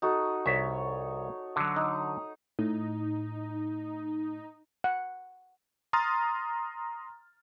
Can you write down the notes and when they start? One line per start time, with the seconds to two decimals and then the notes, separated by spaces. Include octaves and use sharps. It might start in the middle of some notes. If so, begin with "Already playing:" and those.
0.02 D#4 F#4 A4
0.46 C2 C#5 E5
1.56 D3 F#3
1.76 D#4
2.59 A2 D#4
4.84 F#5
5.93 A#5 C6 D#6 F6 A6